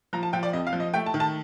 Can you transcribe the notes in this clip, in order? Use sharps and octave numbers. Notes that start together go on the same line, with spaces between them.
F3 A#5
A5
F3 G5
D5
F2 D#5
F5
F3
D#5
A3 G5
A5
D#3
A5